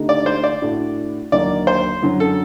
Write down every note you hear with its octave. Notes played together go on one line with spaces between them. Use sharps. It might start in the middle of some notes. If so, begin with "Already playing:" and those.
Already playing: D3 A3 D#4 G4
D5
C5
D5
A2 A3 D4 F#4
D#2 D3 F#3 A#3 D#4 D5
C5
F#2 D3 F#3
A4